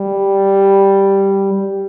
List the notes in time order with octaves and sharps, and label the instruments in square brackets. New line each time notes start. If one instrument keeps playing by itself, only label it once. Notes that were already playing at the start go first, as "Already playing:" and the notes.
Already playing: [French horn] G3
G3